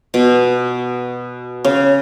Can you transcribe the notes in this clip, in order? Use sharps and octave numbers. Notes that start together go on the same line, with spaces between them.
B2
C#3